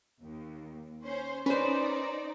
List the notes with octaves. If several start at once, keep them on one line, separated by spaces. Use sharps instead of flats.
D#2
C#4 C5
C#4 D#4 B4 C5 D5